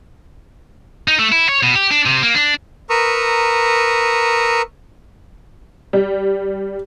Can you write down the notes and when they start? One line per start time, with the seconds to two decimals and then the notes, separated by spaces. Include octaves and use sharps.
1.08 D#4
1.19 A3
1.32 E4
1.49 C#5
1.63 B2
1.75 G4
1.91 D4
2.06 C3
2.23 A#3
2.35 D4
2.90 A#4 B4 A#5 C#6 D#6 E6
5.93 G3